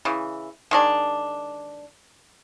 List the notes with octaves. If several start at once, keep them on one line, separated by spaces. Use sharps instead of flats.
C#3 E3
D#3 G#3 D4